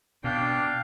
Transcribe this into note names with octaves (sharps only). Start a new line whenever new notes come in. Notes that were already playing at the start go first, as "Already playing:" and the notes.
B2 D4 F5 G5